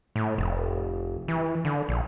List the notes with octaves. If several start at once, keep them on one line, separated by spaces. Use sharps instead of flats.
A2
F1
E3
D3
A#1